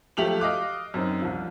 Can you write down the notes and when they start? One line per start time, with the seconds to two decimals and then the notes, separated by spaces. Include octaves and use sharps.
0.17 F3 F#3 A3 G4 F7 F#7
0.40 D#5 F5 D6 F#6
0.94 F#2 C4 D#4
1.22 C2 F3